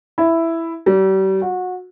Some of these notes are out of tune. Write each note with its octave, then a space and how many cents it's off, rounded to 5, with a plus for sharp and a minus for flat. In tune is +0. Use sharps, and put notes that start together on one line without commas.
E4 +5
G3 -40
F#4 -25